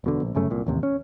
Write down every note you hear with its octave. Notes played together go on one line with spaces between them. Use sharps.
E1 B2 D3
A#1
G1 F#2 C#3 A3
C2 A#2
A1 D#2 C3
C#4